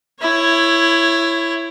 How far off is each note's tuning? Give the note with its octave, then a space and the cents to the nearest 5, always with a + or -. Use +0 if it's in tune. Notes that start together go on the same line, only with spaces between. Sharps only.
E4 +15 C#5 -10